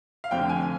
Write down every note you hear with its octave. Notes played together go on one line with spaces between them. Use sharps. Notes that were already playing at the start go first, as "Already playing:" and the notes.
F5
F1 F2 D3 G5
G#5